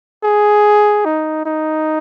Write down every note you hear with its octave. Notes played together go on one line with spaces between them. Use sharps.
G#4
D#4
D#4